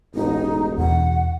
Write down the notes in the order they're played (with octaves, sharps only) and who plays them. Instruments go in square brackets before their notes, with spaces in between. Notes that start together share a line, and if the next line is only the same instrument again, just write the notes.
[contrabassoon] E1 [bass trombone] A1 [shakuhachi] D#4
[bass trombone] A1
[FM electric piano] E2 B2 E3 [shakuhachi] F#5